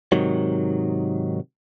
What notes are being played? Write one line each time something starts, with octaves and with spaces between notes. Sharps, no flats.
G#2 C3 D#3 F#3